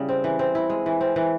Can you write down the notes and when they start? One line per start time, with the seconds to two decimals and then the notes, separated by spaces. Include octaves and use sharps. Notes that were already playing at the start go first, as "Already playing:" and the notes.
Already playing: C#3 G3 E4
0.09 C4
0.24 E3
0.39 C4
0.55 E4
0.70 G#3
0.86 E3
1.01 C4
1.16 E3